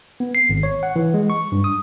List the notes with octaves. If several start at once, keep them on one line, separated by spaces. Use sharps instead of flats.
B3
C7
G#1
C#5
F#5
E3
G#3
C#6
G2
D#6